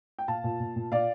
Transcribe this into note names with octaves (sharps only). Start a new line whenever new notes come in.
G5
A#2 F5 A5
A#2
A#2
A#2
A#2 D5 F5